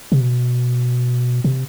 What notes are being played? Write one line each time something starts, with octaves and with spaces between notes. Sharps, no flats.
C3
B2
B2
C3